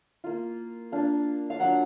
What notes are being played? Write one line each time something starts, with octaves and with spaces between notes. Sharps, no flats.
A#3 F4
A#3 D4 F4
F5
F#3 D4 F4 F#5